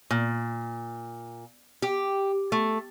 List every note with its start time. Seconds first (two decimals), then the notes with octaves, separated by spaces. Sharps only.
0.11 A#2
1.82 G4
2.52 A3